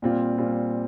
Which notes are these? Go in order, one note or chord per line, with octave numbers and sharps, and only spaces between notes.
A#2 G3 C4 F4
A#2 G3 C4 F4